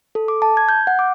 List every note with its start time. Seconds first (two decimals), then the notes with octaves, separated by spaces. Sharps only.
0.15 A4
0.28 D6
0.42 A5
0.57 G#6
0.69 G6
0.87 F#5
0.99 D6